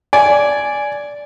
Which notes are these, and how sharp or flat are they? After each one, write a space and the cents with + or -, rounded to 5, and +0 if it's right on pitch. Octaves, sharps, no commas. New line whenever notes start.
D5 -10 G#5 +5